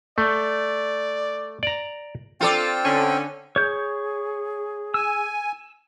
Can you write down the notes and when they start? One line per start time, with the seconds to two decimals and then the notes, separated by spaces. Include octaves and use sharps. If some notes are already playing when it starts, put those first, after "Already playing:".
0.18 A3 D5
1.63 D5 A#5
2.41 C4 F4 A4 D5 G5
2.84 D3 C#4
3.56 G#4 C#5 G6
4.94 G#5 E6